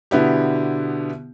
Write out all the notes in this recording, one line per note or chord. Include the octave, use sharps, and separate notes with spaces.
B2 D3 B3 E4 G4